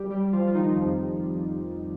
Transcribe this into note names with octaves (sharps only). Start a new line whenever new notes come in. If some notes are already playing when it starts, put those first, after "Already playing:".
Already playing: G3 G4
G3 G4
F3 F4
F4
D#3 D#4
F2 F3